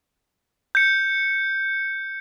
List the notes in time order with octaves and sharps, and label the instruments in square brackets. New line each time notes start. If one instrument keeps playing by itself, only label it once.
[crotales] G6 C#7